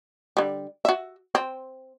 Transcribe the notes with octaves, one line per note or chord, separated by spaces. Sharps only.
D3 G3
F#4 E5
C4